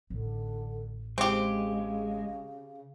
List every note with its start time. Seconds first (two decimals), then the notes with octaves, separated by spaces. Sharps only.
0.10 A1 D3
1.18 C#3 G#3 C4 G4